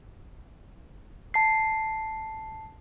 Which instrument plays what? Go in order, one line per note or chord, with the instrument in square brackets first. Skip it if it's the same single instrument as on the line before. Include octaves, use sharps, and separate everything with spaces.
[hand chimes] A5 C7